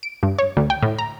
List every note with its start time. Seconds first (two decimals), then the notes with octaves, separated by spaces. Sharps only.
0.03 D7
0.23 G2
0.39 C#5
0.57 D2
0.70 G5
0.83 A2
0.98 A#5